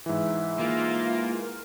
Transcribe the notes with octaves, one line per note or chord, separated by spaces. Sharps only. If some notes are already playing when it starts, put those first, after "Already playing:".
G#2 E3 E5
A#3 F4
A#4